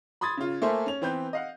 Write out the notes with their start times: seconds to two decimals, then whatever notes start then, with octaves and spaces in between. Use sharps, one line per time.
0.21 B5 C6 D#6 G#6 A6
0.37 C#3 F4
0.62 A3 A#3 A4 C5 E5 G#5
0.86 C#4 F7
1.02 E3 B3 C4 B4 G6
1.33 D#5 F5 F#5